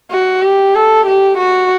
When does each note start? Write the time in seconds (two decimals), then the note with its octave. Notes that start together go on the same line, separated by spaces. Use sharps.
0.11 F#4
0.42 G4
0.75 A4
1.06 G4
1.38 F#4